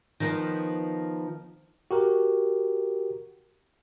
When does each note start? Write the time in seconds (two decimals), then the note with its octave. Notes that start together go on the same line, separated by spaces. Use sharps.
0.20 D#3 F3 B3
1.91 F#4 G4 A#4